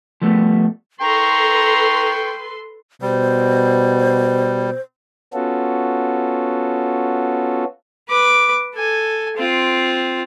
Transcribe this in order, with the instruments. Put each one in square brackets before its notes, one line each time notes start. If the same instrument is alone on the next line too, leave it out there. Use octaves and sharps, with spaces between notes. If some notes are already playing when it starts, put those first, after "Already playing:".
[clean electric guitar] F3 G3 A3 B3
[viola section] A4 B4 C6 [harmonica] G5 C#6 [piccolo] A#5
[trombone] B2 [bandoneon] G3 [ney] C5
[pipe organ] B3 C#4 F4 F#4 A4
[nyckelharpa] B4 D6
A4 G#5
C4 F4